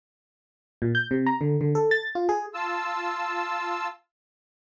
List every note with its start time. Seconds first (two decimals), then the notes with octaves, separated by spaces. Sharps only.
0.82 A#2
0.95 G6
1.11 C3
1.26 A#5
1.41 D3
1.61 D3
1.75 A4
1.91 A6
2.15 F4
2.29 G#4
2.54 F4 A5 E6